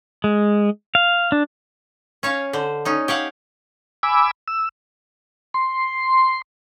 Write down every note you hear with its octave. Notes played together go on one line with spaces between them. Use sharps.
G#3
F5
D4
C#4 C#5 F5
D3 C5
C#4 D#4
G4 C#5 F5 F#5
G#5 B5 D6 E6
E6
C6